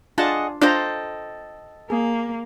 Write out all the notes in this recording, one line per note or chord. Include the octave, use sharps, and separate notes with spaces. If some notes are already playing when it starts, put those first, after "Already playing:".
D4 F4 G#4 D#5 F#5 A5
D4 F4 A4 C5 D#5 G5 A#5
A#3 G#4